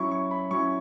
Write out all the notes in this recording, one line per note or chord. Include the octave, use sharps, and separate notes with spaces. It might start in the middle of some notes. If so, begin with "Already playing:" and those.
Already playing: F#3 C#4 E4 C#6
C#6
B5
F#3 C#4 E4 C#6